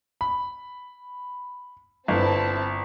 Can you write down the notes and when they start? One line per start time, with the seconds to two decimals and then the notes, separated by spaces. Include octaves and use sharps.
0.21 B5
2.08 G1 C4 E4 A5